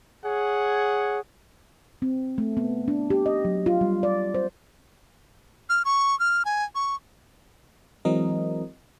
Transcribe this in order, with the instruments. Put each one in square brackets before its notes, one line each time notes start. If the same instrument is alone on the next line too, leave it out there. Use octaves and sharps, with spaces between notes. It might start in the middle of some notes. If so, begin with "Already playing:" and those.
[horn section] G#4 C#5 F#5
[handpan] C4
A3
B3
D4
G4
D#5
F#3
F4
G3
D5
C5
[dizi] F6
C#6
F6
G#5
C#6
[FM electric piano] E3 F#3 G#3 C4 A#4 D#5